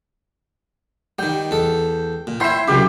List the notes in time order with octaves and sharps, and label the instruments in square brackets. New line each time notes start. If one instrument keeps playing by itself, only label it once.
[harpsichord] D#3 G3 [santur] G5
[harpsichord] E2 A4
A#2
[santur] E4 G5 C6 [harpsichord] C#5 E5
[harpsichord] C2 F#2 C#3 [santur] G4 G5